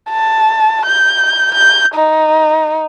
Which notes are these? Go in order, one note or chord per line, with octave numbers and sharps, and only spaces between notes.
A5
G6
G6
D#4